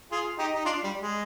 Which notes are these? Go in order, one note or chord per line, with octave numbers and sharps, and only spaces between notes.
F4 G#4
D#4 G4
D#4
D4 F4
G3
G#3